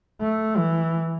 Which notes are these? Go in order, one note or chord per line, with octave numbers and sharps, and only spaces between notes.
A3
E3